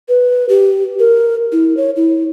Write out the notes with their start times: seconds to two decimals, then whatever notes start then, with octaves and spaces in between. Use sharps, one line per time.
0.08 B4
0.49 G4
0.99 A#4
1.52 E4
1.77 C#5
1.96 E4